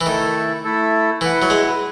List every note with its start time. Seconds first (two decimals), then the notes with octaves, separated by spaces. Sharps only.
0.01 E3
0.06 D#3 A3 E4 A4
0.64 A3 E4 A4
1.21 E3 E4 B4 F#5
1.42 F#3
1.50 G#3